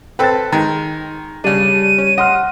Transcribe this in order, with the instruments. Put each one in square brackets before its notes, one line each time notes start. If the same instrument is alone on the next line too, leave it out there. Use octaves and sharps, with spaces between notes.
[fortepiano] C4 A4 B4 [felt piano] G5 A6
[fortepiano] D#3 G#3 [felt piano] A#5
[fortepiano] C#3 D4 [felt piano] G3 [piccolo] D#7
[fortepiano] C#4
[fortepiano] D#5 [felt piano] F#5 C6 F6